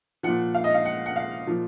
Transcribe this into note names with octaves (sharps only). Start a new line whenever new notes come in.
A#2 F3 F#5
F5
D#5
F5
F#5
F#5
F5
A#2 F3